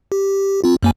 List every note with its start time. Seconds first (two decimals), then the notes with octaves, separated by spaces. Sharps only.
0.12 G4
0.64 C4 F4
0.83 F#2 A#3 G#5